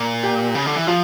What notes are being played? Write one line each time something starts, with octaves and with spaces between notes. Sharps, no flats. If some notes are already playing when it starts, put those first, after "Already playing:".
Already playing: A#2
G4
C#3
D3
E3
F3 F4